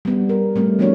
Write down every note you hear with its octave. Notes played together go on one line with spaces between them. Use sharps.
G3 B3
A#4
G3 A3 C4
F3 A3 B3 D4 F#4 C#5